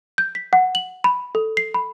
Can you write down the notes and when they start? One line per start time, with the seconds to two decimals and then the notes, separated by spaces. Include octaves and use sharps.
0.18 G6
0.35 B6
0.53 F#5
0.75 F#7
1.04 B5
1.35 A4
1.57 C7
1.74 B5